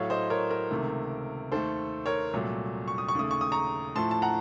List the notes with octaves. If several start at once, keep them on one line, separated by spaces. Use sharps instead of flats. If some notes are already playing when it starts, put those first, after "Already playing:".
Already playing: A2 F#3 A3 C#5 F5
C5 D#5
A#4 C#5
A#4
C#2 C3 D#3 A3
D#2 D#3 A3 A4 C5
A#4 C#5
C2 A#2 F#3 A3
C#6
D#6
C#6
D#2 C#3 A3 D#6
C#6
D#6
A#5 C#6
A2 F3 A3 A5 C6
A5
F#5 A#5